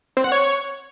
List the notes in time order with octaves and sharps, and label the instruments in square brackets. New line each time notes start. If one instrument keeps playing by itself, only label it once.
[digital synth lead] C4
F#5
C#5